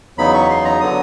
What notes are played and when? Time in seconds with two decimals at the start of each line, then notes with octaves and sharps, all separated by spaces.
0.18 E2 C#3 F#3 B3 D#4 B5
0.34 C#6
0.50 C6
0.65 A#5
0.80 D3 F#3 B3 D#6